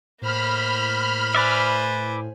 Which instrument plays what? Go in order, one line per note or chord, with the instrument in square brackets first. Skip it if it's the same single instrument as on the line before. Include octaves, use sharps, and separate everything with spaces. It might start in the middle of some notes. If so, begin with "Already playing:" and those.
[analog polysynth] A2 [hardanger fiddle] A#3 C5 [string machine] B5 F6
[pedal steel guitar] B4 D5 E5 [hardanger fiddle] C5 G#5